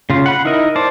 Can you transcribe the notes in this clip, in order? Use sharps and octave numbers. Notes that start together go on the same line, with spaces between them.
C#3 F4
F#5 B5
D#4 E4 A#4 D#5
C5 D5 A5